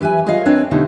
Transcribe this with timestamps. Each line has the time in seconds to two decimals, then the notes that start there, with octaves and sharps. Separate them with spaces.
0.01 E3 G4 B4 E5 G#5
0.26 F4 G#4 A#4 C#5 D#5 F5
0.45 C4 D4 B4 C#5
0.71 B2 D3 A3 D#4 G4